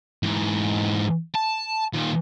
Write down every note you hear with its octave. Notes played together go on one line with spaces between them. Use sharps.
G#2 E3
A5
A#2 D#3